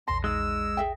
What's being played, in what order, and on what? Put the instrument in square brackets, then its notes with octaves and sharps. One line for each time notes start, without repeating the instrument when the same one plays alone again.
[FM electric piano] A#1 E2 A#6 [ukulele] A5 [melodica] C6
[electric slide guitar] G#3 [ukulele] D#4 D5 [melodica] E6
[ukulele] G#4 E5 G5